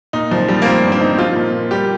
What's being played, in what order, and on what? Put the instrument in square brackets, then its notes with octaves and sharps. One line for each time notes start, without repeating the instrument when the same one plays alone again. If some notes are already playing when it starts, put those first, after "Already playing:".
[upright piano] A#2 [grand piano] D#4
[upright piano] C2 [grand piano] F3
[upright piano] F3 [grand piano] G3
[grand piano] A#3
[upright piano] F3 [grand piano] C4
[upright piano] G2
[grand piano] C4
[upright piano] D#4
[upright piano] F3 [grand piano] F4
[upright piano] A#2
A#3
[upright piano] G3 [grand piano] G4